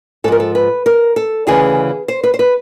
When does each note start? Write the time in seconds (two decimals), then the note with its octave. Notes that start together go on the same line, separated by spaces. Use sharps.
0.24 G#2 A4
0.28 F3 A#4
0.40 A4
0.55 B4
0.86 A#4
1.16 A4
1.47 D2 C#3 E3 G#4
2.08 C5
2.24 B4
2.34 C5
2.39 B4